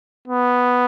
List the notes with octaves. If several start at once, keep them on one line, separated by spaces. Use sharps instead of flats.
B3